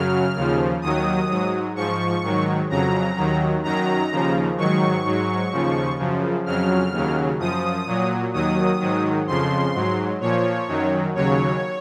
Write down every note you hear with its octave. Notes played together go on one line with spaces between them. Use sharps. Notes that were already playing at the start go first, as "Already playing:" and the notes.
Already playing: F#2 C#3 F#3 F6
D#2 C#3 F3
D#2 D#3 F#3 D#6
G#2 F#3
G#2 F3 C#6
G#2 D#3 F#3
F2 C#3 F#3 A#5
D#2 D#3 F#3
F#2 D#3 F#3 A#5
D#2 C#3 F3
G#2 D#3 F#3 C#6
G#2 F#3
D#2 C#3 F3
F#2 C#3 F3
F2 C#3 F#3 F6
D#2 C#3 F#3
F#2 F3 D#6
A#2 F#3
D#2 D#3 F#3 D#6
G#2 D#3 F#3
F2 C#3 F3 C6
G#2 F#3
A#2 F3 C#5
F#2 D#3 F#3
D#2 C#3 F#3 C#5